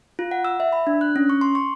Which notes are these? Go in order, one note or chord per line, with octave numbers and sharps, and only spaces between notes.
F4
F#5
E6
E5
B5
D4
F#6
C#4
C#6
C6
C#6